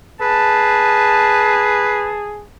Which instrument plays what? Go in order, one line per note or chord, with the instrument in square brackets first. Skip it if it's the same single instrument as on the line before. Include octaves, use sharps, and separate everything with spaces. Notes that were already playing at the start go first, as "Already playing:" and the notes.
[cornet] G#4 [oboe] B4 [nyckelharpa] A5